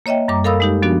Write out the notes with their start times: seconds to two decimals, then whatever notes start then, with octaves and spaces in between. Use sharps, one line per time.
0.06 A#3 C#5 D#5 E5 G5
0.28 F#2 G3 A#5 D6
0.44 A4 A#4 F5 B5 D#6 E6
0.60 G#3 D#4 G4
0.82 F3 B3 D4 F#4